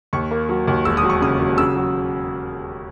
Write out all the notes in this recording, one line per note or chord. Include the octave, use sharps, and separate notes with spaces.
D#2 C#6
A#3
F#3
D#2
E1 E6
D#6
F#3
C#6
C#3 D#6
F#3
C#3 E6
F#3